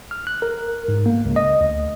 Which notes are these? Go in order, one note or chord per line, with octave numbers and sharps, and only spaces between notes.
F6
F#6
A#4
G#2
A#3
C#2
D#5
D2